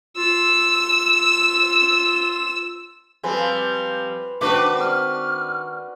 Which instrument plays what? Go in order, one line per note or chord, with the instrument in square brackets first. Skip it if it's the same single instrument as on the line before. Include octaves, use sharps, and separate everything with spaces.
[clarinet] F4 [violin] E6
[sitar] F3 G3 C4 [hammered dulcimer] B4 C5 G#5
[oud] D#3 C4 [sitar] D4 B4 C5 [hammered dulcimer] F#4 F#5 [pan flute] D6
[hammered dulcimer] D5 [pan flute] F6